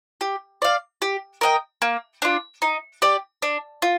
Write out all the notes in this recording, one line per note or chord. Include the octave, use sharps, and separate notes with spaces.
G4
D5 F5
G4
A#4 D#5 G5
A#3
D4 F4
D#4
G4 D5
D4
F4